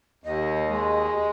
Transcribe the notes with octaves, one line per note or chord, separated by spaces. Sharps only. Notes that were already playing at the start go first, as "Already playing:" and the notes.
D#2 D#5
G#3